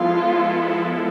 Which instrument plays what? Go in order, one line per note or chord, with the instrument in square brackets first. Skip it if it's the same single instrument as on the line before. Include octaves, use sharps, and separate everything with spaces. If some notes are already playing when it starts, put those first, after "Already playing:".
Already playing: [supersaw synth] F3 G#3 B3 E4 A4 [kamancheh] F4